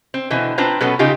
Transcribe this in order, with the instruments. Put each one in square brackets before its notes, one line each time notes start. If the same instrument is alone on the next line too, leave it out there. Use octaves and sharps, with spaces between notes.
[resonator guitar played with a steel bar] C4
B2 D3 E3 C4
C4 D4 F4 B4 C5 A#5
B2 F#3 B3 C#4 A4 B4
C#3 D#4 F4 G4